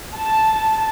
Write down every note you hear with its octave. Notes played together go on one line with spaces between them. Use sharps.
A5